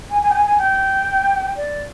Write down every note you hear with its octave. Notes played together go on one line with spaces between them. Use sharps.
G#5
G#5
G5
G#5
G#5
G5
D5